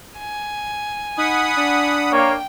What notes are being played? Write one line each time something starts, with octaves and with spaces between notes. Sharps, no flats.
G#5
D#4 F#5 B5 D#6
D4
A#3 C#5 G5